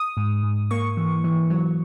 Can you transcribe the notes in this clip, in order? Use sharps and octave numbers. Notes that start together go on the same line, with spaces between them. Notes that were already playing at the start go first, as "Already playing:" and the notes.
Already playing: D#6
G#2
G#2
A#3 C#6
E3
E3
F#3